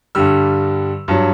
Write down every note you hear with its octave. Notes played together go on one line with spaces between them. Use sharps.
G2 D3 G3 E6
G2 F#3